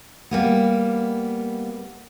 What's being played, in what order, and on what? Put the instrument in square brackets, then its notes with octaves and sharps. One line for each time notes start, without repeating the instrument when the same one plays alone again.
[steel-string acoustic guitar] G3 A#3 B3